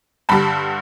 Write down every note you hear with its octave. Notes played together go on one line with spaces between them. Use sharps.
G2 D3 G3 A5 B5